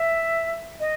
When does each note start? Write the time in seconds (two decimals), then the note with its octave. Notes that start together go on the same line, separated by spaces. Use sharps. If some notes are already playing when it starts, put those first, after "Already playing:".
Already playing: E5
0.80 D#5